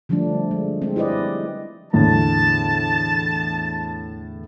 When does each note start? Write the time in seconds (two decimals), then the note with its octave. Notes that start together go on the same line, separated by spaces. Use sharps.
0.09 D3 F3 G3 A3 D4
0.51 G#3
0.82 G#3 C4
0.96 E4 G4 B4 D5 D#5
1.93 E2 A2 D3 A5